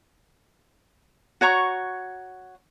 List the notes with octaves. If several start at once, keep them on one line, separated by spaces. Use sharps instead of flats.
F#4 C#5 A#5 C#6